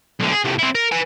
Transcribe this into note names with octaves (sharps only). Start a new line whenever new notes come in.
B1 D3
G#4
A2 C3
C4 E4
A#4
B4 G#5